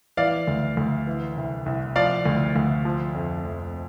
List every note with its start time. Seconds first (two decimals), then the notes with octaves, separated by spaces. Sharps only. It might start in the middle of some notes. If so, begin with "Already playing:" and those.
0.17 E3 D5 F5
0.47 D2
0.77 D2
1.07 E3
1.36 C2
1.66 C2
1.96 F3 D5 F5
2.26 D2
2.56 D2
2.85 F3
3.15 F2
3.45 F2